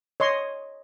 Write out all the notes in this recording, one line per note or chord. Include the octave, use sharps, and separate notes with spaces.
C#5 D#5 C6